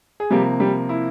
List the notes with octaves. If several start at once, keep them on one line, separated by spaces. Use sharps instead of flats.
G#4
C3 F3 G3 A#3 G4
G3 G4
E4